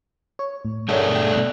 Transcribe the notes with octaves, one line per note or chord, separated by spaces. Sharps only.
C#5
A2
A3 D4 G#4 A#4 C#5 F#5
G5
B2 F#6